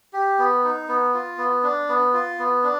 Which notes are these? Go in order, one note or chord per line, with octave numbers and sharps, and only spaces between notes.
G4
B3
D#4
B3
F4
B3
D4
B3
F4
B3
D4